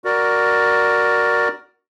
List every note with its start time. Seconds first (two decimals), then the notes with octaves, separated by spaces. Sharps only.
0.04 F#4 A#4 D5